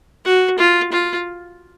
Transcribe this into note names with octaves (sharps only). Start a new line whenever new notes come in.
F#4
F4
F4